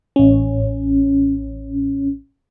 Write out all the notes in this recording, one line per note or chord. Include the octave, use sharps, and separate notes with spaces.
A1 C#4